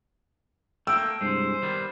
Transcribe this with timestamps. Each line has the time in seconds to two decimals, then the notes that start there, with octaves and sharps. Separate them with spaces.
0.87 A3 A#3 G5 E6
1.21 C2 G2 G#3 C5
1.62 D#3 G3 B3